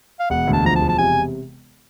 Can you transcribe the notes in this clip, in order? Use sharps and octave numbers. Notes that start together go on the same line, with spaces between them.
F5
E1 F#5
D2
A5
F3 A#5
A5
E1
A5
C3 G#5